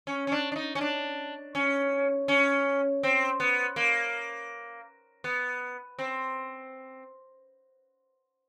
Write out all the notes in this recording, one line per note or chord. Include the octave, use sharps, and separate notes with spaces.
C#4
C#4
D4
D4
D#4
C#4
D4
C#4
C#4
C4
B3
A#3
B3
C4